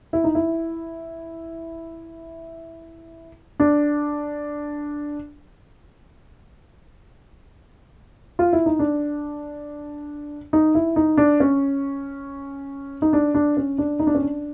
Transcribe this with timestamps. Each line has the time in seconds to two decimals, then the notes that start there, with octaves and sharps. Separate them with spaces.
0.13 E4
0.24 D#4
0.35 E4
3.60 D4
8.39 F4
8.53 E4
8.66 D#4
8.79 D4
10.53 D#4
10.75 E4
10.96 D#4
11.17 D4
11.40 C#4
13.02 D#4
13.13 D4
13.35 D4
13.57 C#4
13.78 D4
13.99 D#4
14.07 D4
14.15 C#4
14.22 D4